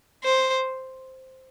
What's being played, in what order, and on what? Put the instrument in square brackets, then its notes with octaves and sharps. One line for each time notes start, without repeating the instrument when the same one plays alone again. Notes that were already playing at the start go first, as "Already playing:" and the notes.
[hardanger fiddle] C5